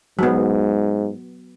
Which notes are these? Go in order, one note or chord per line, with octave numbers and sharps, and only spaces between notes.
G#2 F#3 B3